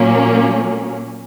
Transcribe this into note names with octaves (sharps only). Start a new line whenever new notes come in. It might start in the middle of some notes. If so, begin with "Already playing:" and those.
Already playing: A#2 F#3 A#3 C#4